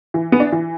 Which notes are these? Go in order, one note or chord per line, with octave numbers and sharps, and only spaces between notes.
E3
B3
D4
E3